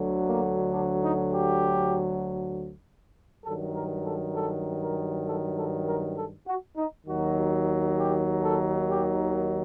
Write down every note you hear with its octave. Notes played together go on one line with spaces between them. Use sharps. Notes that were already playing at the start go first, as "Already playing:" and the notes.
Already playing: D2 D3 F#3
A#3
D4
D#4
G4
G2 D#3 F#3 A4
A#4
A4
A4
A#4
A4
A4
A#4
A4
F#4
D#4
D#2 D#3 F#3 F#4
G4
A4
G4